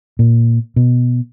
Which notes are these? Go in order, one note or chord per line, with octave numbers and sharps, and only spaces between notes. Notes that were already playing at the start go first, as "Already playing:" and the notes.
A#2
B2